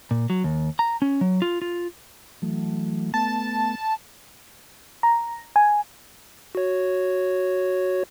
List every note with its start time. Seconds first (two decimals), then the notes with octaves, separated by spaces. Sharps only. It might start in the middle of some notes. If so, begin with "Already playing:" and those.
0.11 A#2
0.30 F#3
0.44 D#2
0.79 A#5
1.02 C#4
1.21 F#3
1.42 F4
1.62 F4
2.42 E3 F#3 A3
3.14 A3 B3 A5
5.03 A#5
5.56 G#5
6.55 F#4 C#5